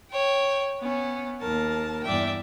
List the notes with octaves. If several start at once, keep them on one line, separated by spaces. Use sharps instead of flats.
C#5 G5
B3 C#4
D#2 A#4 A5
E2 G2 D5 E5 G5